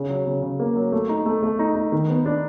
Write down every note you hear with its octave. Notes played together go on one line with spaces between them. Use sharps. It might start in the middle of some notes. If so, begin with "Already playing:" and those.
Already playing: C#3
F#3
C#3
C#3
A#3
F#3
A3
D#4
A3
A3
D#4
D#4
D#3
B3
D4